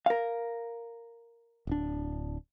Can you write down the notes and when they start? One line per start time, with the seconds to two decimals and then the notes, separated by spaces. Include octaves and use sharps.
0.06 A#4 F5
1.67 D1 D4